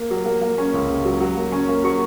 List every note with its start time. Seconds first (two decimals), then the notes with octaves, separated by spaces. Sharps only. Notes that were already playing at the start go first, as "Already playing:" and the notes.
Already playing: A#3
0.11 F#3
0.26 A#3
0.41 A#3
0.58 C#4
0.73 C#2
0.90 C#2
1.05 F#3
1.20 F#3
1.37 A#3
1.52 C#4
1.69 A#3
1.84 F#3 C#6